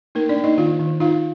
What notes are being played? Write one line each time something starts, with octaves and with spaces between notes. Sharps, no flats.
A#3 D#4 A#4
D4 D5
A#3
D#4 D#5
D#3 F4 F5
D#3
D#4 F4 F5